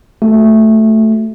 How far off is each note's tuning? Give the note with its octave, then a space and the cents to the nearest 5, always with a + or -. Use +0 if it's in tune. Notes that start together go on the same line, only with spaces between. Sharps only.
A3 +0 F#4 +0